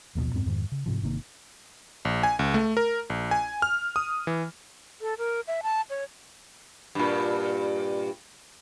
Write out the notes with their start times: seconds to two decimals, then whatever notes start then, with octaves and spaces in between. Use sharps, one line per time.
0.15 A1 D#2 B2 F3
0.34 F2 G#2 C4
0.46 F2 G#2 D#3
0.72 C#3
0.86 G#2 C3 F3
1.02 G1 C3 D#3 A#3
2.05 A#1
2.23 G#5
2.39 C#2
2.54 A3
2.77 A#4
3.10 A#1
3.31 G#5
3.62 F6
3.96 D#6
4.27 E3
5.01 A4
5.18 A#4
5.47 E5
5.63 A5
5.90 C#5
6.95 G2 A#2